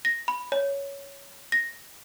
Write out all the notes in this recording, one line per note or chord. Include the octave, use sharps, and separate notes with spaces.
A#6
B5
C#5
A#6